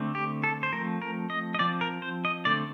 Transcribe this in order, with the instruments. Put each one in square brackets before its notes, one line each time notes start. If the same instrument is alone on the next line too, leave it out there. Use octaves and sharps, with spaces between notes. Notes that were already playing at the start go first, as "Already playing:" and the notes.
Already playing: [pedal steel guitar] D3 A3 C4
G4
A4
C5
F3 A3 C4 A#4
A#4
D#5
D#5
F3 C4 D5
A#4
C5
D#5
D3 A3 C4 D5